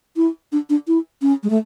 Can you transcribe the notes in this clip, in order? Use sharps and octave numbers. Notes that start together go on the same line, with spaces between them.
E4
D4
D4
E4
C#4
G#3
A3